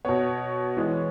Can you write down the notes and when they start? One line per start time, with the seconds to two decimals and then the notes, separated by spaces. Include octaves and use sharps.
0.05 B2 B3 C#5
0.77 E3 G#3 B3